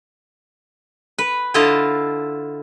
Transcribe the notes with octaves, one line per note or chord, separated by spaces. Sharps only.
B4
D3 E4 F4 D#5 F5 A5